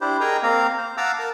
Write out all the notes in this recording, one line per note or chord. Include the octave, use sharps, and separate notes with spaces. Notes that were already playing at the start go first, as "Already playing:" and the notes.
D4 E4 G4 C5
G#4 A#4 D#5 G5 G#5 A#5
A#3 C4 A#4 F5 A#5
C5
F5 F#5 A5 A#5 D6 E6
A#4 A5